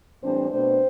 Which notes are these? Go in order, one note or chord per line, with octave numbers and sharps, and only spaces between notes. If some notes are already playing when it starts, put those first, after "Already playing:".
A2 E3 G3 C4 D4 C5
B2 A3 C4 D4 C5